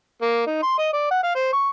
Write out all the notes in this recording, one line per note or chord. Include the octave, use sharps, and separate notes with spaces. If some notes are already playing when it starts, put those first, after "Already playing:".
A#3
D#4
C6
D#5
D5
F#5
F5
C5
C#6